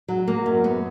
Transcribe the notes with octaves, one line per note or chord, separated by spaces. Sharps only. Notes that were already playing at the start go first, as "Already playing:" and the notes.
F#3
A#3
F#2
B3